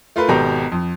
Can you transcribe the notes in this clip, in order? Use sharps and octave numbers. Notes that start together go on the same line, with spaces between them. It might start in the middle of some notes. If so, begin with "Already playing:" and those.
A3 F4 A#4 B4
G#1 B2 G4 A4 A#5
F2